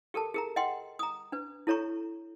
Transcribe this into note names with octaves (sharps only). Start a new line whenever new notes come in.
G4 A4 A#4 A5
G#4 A#4 A#5
D#5 F#5 G5 C6
A#5 D#6
D4 B4
E4 A4 C#5 A#5 C#6